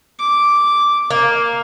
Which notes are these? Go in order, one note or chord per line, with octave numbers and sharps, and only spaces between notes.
D6
A#3